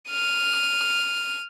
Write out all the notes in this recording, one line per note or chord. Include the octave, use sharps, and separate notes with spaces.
F6 D#7